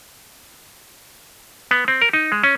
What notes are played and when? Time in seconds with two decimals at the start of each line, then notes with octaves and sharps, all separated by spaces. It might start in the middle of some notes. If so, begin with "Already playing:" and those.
1.71 B3
1.88 C4
2.02 A#4
2.13 D#4
2.32 G#3
2.44 C#4